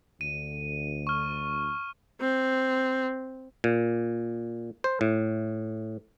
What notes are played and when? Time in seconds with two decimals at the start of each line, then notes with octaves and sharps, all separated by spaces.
0.21 D2 D#7
1.07 C#6 F6
2.21 C4
3.64 A#2
4.84 C5
5.01 A2